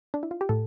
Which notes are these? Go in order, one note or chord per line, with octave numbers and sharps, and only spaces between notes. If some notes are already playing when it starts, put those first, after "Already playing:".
D4
E4
F4
G4
A2 A4